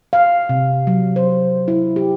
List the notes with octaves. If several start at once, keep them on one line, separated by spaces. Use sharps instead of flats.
F5
C3
F#3
C5
E4
G4